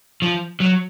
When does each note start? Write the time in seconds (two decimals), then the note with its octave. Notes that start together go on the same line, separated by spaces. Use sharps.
0.22 F3
0.60 F#3